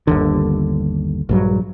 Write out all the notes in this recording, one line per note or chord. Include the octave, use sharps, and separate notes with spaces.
G1 D#2 D3
A#1 G2 F#3